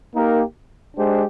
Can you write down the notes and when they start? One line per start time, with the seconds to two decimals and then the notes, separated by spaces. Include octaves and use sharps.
0.15 A#3 D#4 G4 A#4
0.96 G#3 D4 G4 C5